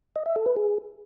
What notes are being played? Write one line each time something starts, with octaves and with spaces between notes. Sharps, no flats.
D#5
E5
A4
B4
G#4